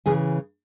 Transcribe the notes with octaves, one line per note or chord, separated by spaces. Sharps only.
C#3 E3 G#4 G#5